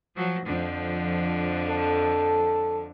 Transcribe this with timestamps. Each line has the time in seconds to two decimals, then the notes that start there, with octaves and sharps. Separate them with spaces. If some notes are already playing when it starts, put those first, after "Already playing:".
0.16 F3 F#3
0.45 F2 D3 F3
1.70 A4